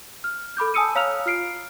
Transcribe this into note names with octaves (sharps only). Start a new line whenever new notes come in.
F6
A4 B5 D6 G6
G#5 A5 D#6 E6 C#7 D#7
C#5 F5 A#5 E6 F6 F7
F4 F6 C7 D7